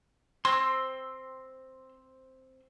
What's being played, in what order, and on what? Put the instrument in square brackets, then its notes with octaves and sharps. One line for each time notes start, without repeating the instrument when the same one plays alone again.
[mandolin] C4 [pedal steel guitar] C6 E6